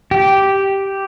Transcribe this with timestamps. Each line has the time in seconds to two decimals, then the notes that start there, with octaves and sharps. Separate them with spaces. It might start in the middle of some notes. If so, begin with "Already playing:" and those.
0.11 G4